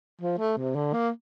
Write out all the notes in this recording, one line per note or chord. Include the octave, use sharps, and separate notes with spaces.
F3
A3
C3
D3
A#3